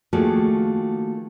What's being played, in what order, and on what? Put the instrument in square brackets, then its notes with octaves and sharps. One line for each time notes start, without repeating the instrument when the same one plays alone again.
[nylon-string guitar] D#3 F3 A3 A#3 F#4 G#4